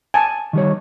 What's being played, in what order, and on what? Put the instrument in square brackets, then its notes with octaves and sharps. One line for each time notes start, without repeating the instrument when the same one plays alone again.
[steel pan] G#5 A5
[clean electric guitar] D#3 G3 C#5